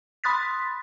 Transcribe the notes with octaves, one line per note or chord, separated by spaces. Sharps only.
B5 C6 D#6 F#6 A6 B6